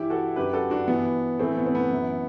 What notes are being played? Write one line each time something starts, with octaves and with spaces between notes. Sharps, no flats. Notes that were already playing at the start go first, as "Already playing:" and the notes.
Already playing: G2 E3 E4 G4
F#4 A4
F#2 D3 G4 B4
F#4 A4
D4 F#4
G2 E3 B3 D4
A2 E3 A3 C4
B3
C4
B3
F#2 E3